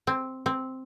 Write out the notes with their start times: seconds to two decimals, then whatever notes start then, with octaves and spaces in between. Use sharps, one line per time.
0.07 C4
0.46 C4